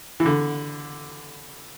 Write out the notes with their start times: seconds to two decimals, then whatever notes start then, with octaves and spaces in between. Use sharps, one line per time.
0.20 E3
0.26 D3